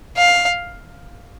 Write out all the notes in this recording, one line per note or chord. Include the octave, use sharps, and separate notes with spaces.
F5